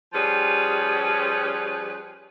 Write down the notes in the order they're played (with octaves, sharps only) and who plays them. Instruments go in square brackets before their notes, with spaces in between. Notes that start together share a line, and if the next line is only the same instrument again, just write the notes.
[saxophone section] F3 G3 C#4 G#4 B4